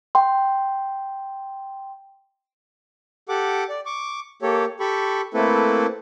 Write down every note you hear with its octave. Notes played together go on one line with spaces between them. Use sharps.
G5 C6
G4 A4 F#5 D6
D5
C#6 D6
A#3 G4 A4 C#5
G4 A4 B5 C#6
A3 A#3 C4 E4 A4 B4